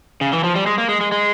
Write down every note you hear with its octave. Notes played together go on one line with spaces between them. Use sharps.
C#3
E3
F3
G3
G#3
A#3
G#3
G#3
G#3